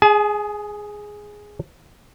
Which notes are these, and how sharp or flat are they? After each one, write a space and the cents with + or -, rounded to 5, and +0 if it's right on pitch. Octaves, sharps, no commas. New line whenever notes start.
G#4 +0 G#5 +40